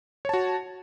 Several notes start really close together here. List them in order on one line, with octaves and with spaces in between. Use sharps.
C#5 A5 F#4